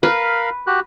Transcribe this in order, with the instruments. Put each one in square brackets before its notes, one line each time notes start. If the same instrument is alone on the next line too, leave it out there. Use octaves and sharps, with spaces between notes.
[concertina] A#4 F5 B5 [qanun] B4
[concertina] F#4 G4 F#6